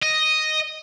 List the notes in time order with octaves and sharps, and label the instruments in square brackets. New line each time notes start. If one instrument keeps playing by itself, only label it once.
[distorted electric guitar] D#5